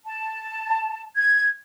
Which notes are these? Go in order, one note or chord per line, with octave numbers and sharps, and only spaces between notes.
A5
G#6